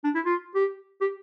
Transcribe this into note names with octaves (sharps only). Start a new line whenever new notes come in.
D4
E4
F4
G4
G4